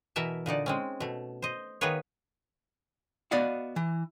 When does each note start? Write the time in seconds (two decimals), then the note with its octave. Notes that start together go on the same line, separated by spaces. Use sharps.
0.16 B2 E3 A#4 E5 A5
0.46 A#2 D3 D#4 D5
0.66 G#3 C4 C#4
1.00 B2 A3
1.42 C5 D#5
1.81 D#3 A#3 B3 G#4 B4 C#5
3.31 B3 F#4 D5 D#5 F5 F#5
3.76 E3